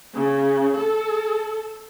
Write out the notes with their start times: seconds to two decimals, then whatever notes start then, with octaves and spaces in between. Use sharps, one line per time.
0.14 C#3
0.78 A4